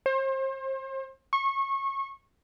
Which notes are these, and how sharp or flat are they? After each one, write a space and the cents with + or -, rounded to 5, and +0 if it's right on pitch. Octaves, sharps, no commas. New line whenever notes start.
C5 +35
C#6 -25